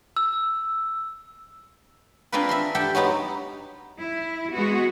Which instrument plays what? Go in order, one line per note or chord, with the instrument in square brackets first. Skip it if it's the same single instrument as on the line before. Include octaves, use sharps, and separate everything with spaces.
[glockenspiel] E6
[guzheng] C4 D4 F4 G#4 A#4 B4
E5 B5 C6
G4 A4 E5 F#5 G5
F#3 G#3 B3 D#4
[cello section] E4
G#3 B3 F#4